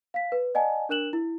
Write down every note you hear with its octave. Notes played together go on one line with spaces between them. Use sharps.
F5 B6
B4
D5 D#5 F#5 G#5 A5
D4 A#4 F#6 E7 F#7
E4